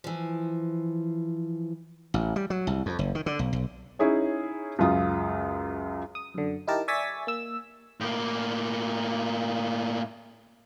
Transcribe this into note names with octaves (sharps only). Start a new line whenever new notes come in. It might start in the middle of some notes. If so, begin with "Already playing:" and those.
E3 F3
A1
G3
F#3
C2
F2
F#1
D#3
D3
B1
B1
C#4 D#4 E4 G#4 C#5
C#2 F#2 F4 D#6
D#6
F#2 D3
D#4 E4 G4 A#4 A5
D5 E5 G#5 C#6 A6 B6
A#3 E6
A2 A#3